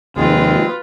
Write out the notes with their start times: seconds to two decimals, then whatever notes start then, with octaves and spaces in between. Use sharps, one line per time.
0.16 D#2 C3 F3 G#3 C4 F4 G#4 B4